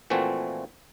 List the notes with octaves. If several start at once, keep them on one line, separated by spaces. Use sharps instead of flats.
A#2 E3 F3 A3 C4 F#4